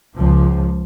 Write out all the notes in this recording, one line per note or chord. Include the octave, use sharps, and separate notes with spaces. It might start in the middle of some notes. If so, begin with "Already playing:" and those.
C#2 F3